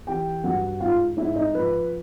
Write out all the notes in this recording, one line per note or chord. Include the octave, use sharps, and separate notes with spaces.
E3 G4 G5
G2 F#4 F#5
G#2 F4 F5
G#2 E4 E5
D#4 D#5
F3 B4